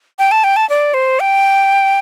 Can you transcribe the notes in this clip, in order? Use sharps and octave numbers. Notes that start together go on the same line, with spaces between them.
G5
A5
G5
A5
D5
C5
G5